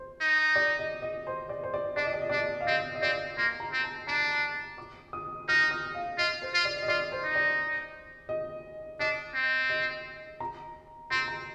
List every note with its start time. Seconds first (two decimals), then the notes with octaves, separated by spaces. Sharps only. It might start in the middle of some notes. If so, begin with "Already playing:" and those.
Already playing: C5
0.21 D#4
0.56 D5
0.79 D#5
1.02 D#5
1.27 C5
1.49 D5
1.64 C5
1.74 D5
1.96 D4 D5
2.05 D#5
2.13 D5
2.21 D#5
2.29 D4 D5
2.37 D#5
2.46 D5
2.61 F5
2.67 C4 D#5
2.95 D#5
3.02 C4 D5
3.37 A#3 C6
3.60 A#5
3.72 C4
3.84 A5
4.07 D4 A#5
4.78 D6
5.13 D#6
5.48 D#4 F6
5.71 D#6
5.95 F5
6.18 F4 D#5
6.42 C5
6.54 F4
6.65 D5
6.82 D#5
6.88 F4 D5
7.12 C5
7.24 D#4
7.35 D5
8.29 D#5
9.00 D4 D#5
9.34 C4
9.70 D#5
10.40 A#5
11.11 C4 C6
11.28 A#5